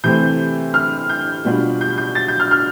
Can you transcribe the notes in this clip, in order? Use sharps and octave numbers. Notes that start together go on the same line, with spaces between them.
C3 E3 A3 C4 G6
F6
G6
B2 G3 D4 F4
G6
G6
A6
G6
F6
F6